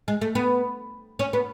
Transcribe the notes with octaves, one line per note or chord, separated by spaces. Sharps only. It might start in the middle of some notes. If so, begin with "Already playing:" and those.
G#3
A3
B3
C#4
B3